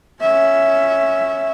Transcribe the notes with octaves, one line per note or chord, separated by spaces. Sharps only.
C#4 E5